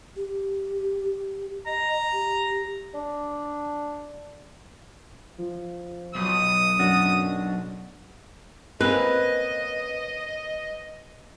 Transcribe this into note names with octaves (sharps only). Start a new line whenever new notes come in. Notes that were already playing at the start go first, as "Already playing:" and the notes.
G4
D#5 A#5
G4
D4
F3
B1 D#6
F#2 D4 F#4
A#3 C4 C#4 B4 D#5